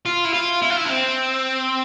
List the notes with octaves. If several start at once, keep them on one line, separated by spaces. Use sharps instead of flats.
F4
E4
F4
E4
F4
E4
D4
C4